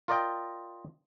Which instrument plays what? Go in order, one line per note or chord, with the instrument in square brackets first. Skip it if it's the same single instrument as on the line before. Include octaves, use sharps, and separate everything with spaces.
[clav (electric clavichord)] F4 A#4 D5 D#5 G5